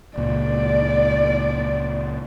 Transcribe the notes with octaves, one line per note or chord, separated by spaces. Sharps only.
C#2 A#2 D5